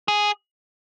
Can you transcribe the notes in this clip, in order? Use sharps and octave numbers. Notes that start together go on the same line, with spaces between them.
G#4